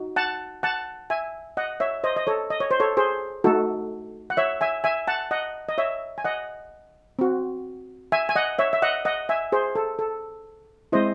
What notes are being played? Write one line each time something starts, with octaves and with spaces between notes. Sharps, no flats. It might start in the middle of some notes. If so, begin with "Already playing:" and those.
Already playing: D#4 F#4
F#5 A5
F#5 A5
E5 G#5
D#5 F#5
C#5 E5
C5 D#5
D#5
A4 C#5
D#5
C#5
C5
A4 C#5
G#4 C5
A3 D#4 F#4 A4
F#5
C#5 E5
E5 G#5
E5 G#5
F#5 A5
D#5 F#5
D#5
C#5 E5
G#5
D#5 F#5
C4 F#4
E5 G#5
G#5
D#5 F#5
C#5 E5
E5
D#5 F#5
D#5 F#5
E5 G#5
G#4 C5
A4
A4
G#3 C4 E4 C5 D#5